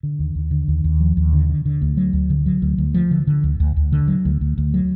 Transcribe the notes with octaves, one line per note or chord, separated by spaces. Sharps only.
D3
D#2
D#2
D3
D#2
D#2
F3
D#2
D3
D3
D3
D2
F#3
D2
D3
F#3
D2
D2
F3
D3
D3
D2
D2
D2
D3
F#3
D2
D2
D2
F#3